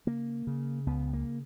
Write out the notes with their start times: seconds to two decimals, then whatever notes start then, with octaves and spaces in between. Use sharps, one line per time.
0.07 C#3 A#3
0.47 C#3
0.87 C#2 B3
1.13 A#3